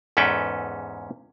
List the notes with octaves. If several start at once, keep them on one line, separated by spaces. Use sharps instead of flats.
E2 G#2 C#4 A4 B4 G5